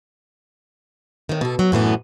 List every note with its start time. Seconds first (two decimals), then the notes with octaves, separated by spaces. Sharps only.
1.29 A2 D#3
1.41 B2 A4
1.59 F#3
1.72 F#2 A2 E3 B3